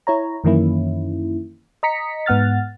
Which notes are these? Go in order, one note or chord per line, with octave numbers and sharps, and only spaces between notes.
E4 C#5 A#5
F#2 D#3 E3 A#3 C#4 E4
D#5 A#5 B6 C#7
G#2 B3 F#5 F6 A6